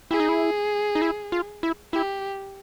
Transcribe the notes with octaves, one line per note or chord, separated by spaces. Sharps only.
E4 G#4
D#4
E4
D#4
E4
F4
E4
E4 G4